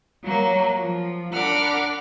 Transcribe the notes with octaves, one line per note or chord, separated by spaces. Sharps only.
F#3 A#3
F3
D4 A#4 F#5 B5 D6 F6